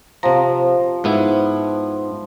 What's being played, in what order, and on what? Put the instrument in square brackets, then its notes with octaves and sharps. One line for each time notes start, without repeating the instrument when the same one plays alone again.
[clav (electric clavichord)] C3 A#5 [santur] F3
[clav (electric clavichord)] G#2 B3 E4